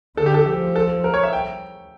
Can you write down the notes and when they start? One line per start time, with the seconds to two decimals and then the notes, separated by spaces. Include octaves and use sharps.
0.17 D3 A4
0.26 G4
0.34 A4
0.46 F3 G4
0.76 A4
1.04 A#4
1.14 C#5
1.23 E5
1.33 G5